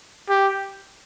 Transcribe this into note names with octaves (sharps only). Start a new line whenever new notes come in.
G4